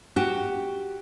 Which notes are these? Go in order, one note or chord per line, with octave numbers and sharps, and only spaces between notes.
F#4 G4